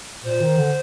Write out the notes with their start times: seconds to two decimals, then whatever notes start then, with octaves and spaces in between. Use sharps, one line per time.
0.24 A#2 C5
0.41 D#3
0.58 D3